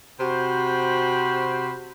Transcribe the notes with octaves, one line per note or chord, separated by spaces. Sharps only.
C3 F#4 C5 G5 B5